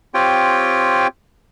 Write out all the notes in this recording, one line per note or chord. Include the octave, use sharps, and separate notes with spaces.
C4 F4 G4 C#5 G5